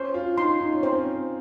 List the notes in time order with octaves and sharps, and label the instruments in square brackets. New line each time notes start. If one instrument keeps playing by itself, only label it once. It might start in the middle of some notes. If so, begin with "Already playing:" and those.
Already playing: [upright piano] C#4 [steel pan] C5
[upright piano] F4
[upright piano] D#4 [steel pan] C6
[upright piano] D#4
C#4
[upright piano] C4 [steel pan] C5
[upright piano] C#4